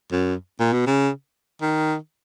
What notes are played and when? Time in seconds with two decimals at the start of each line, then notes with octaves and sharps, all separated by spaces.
0.12 F#2
0.60 A#2
0.73 B2
0.87 C#3
1.62 D#3